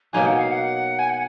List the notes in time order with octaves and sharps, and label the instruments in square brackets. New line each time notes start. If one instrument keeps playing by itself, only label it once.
[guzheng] B2 F#3 A#3 D#4 F#4 [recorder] G#5
[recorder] F#5
F5
F#5
G#5
F#5